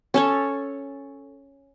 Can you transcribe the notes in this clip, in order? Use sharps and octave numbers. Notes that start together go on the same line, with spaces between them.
C#4 A4 C#5